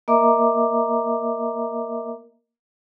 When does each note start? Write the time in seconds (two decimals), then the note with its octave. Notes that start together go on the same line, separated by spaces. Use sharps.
0.08 A#3 A#4 D#5 E5 A#5 D6